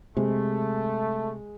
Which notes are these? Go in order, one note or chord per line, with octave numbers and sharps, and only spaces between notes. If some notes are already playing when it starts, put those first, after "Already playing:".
C3 G#3 A3